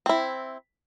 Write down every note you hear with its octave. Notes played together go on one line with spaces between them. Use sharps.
C4 E4